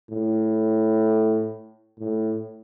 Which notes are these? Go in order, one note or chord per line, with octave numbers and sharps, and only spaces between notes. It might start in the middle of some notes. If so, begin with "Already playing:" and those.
A2
A2